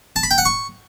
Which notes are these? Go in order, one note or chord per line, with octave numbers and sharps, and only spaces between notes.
A5
B5
G5
F#5
C#6